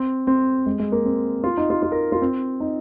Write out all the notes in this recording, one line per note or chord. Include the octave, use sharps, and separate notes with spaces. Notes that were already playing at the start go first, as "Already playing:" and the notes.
Already playing: C4
C4
G#3
G#3
A#3
C4
F4
D#4
F4
F4
A#4
F4
C4
D#4